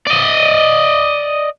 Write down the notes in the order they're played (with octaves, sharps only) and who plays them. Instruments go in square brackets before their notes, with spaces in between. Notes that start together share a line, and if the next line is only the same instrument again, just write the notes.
[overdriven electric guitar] D5 D#5